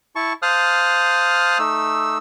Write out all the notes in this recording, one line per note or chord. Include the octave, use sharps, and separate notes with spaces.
E4 A5 C#6
C5 F5 A5 D#6 F6 F#6
A3 D#4 E6